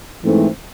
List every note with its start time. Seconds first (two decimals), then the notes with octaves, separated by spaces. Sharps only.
0.24 G#2 E3 A3 C4